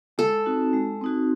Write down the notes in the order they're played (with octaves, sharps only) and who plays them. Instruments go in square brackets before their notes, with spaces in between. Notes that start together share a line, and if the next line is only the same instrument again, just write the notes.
[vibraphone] G#3 [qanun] A4
[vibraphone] C4 D#4 F#4
G#3
C4 D#4 F#4